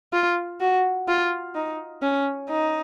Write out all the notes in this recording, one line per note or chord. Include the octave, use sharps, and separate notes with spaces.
F4
F#4
F4
D#4
C#4
D#4